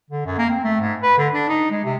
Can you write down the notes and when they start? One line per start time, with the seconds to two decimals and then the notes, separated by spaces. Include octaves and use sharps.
0.10 D3
0.26 F#2
0.38 A#3
0.50 C4
0.64 A3
0.80 G#2
1.02 B4
1.17 D3
1.33 D4
1.49 D#4
1.71 G#3
1.84 C3